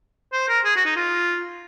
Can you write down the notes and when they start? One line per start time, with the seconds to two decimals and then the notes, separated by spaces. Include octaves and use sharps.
0.32 C5
0.48 A#4
0.64 G#4
0.76 F#4
0.85 D#4
0.96 F4